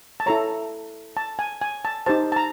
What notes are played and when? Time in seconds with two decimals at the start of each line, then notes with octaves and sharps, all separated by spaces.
0.20 A5
0.26 E4 A4 C#5 A#5
1.17 A5
1.39 G#5
1.61 G#5
1.85 A5
2.06 D#4 G4 C5 A5
2.32 A5
2.36 A#5